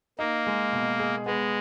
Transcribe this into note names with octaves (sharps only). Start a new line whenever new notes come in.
A#3 D#4
G#3
B2
G#4
G#3 B3